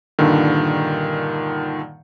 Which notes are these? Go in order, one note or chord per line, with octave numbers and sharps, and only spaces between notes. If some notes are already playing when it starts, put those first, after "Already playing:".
G2 A#2 D3 D#3